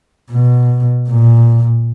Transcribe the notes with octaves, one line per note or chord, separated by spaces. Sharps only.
B2
A#2